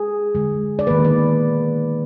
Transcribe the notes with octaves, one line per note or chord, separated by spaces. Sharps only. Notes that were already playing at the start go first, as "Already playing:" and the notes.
Already playing: G#4
D3 G#3
D5
D#3 A#3 B4
D5